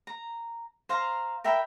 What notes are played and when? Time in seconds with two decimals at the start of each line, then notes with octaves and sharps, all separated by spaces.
0.07 A#5
0.89 C5 F5 A#5
1.44 A#4 E5 G5 B5